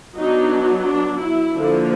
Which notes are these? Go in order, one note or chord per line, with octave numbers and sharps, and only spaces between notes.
F#3 B3 D4 D#4
D4
E4
D3 F3 A#3